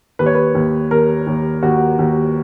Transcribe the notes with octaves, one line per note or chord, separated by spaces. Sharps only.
D#2 B4
C#5
B4
D#2
D#2 A#4
D#2
D#2 F#4
D#2